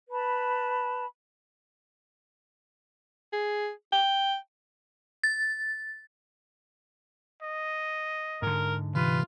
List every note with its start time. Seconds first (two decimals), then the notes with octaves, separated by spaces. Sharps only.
0.10 B4 A5 B5
3.33 G#4
3.93 G5
5.24 A6
7.43 D#5
8.42 G#2 D3 A#4
8.95 C3 E3 F4 B4